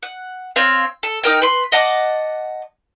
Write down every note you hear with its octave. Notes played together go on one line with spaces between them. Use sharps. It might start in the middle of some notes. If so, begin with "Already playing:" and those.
F#5
C4 C#5 F5
A4
D#4 A#4 G5
B4 C6
D#5 F#5 A5 D6